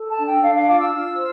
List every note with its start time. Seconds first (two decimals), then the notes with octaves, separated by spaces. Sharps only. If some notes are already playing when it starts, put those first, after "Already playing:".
Already playing: A4
0.09 A5
0.17 D4
0.26 G5
0.42 D4 F5
0.55 F5
0.67 F4 D6
0.79 E6
0.92 F4
1.16 C5